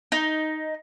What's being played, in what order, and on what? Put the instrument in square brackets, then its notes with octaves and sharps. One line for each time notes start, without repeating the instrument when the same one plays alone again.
[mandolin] D#4